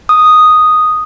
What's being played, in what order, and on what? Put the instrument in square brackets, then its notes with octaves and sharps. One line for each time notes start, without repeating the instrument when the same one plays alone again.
[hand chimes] D#6